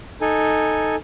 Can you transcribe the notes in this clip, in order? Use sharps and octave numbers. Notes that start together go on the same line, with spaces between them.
D#4 A4 G#5